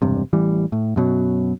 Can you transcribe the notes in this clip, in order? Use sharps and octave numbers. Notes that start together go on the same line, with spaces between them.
E1 G2 C3
A1 E3 G3
A2
F#2 B2 F#3